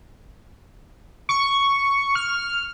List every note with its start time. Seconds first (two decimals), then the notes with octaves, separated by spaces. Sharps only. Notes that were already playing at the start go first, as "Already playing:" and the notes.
1.29 C#6
2.15 F6